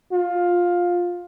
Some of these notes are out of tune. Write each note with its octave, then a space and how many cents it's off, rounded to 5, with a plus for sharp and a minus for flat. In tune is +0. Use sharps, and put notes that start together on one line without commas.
F4 +15